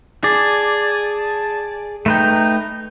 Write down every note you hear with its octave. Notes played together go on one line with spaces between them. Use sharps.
G#4 D5 A5
A3 D#4 B4 G5 A#5